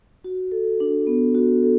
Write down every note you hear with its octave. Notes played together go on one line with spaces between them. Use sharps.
F#4
A4
D4
B3
F#4
A4